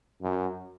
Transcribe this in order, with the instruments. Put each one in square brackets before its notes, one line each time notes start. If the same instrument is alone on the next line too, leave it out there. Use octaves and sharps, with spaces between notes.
[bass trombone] F#2